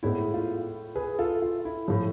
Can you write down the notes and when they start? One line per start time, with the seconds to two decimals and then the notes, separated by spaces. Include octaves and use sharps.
0.03 A2 G#3 B3 E4
0.34 F4
0.96 G#4 B4
1.19 F4 A4
1.42 F4
1.65 E4
1.88 A2 F3